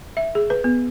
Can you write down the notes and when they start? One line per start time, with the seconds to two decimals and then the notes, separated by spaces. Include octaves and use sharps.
0.17 E5
0.35 G#4
0.50 B4
0.64 B3